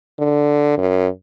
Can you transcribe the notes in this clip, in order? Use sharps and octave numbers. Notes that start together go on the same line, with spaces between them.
D3
F#2